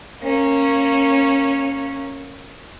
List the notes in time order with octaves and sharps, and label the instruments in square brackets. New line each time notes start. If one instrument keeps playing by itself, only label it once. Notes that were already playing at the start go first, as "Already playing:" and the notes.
[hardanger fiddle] A#3 C#4